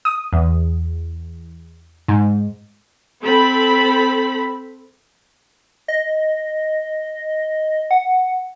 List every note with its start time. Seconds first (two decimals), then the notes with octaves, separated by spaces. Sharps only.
0.05 D#6
0.33 E2
2.08 G#2
3.21 C4 A4 B5
5.88 D#5
7.91 F#5